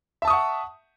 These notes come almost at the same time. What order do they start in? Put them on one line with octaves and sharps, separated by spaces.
E5 A5 D#6 C#6 F#5